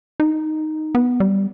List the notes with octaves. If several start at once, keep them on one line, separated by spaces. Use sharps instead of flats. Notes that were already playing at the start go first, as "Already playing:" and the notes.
D#4
B3
G3